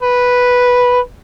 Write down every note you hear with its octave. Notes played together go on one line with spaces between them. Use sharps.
B4